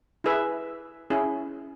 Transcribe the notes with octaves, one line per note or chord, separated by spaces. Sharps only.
E4 G#4 B4 E5
C#4 E4 G#4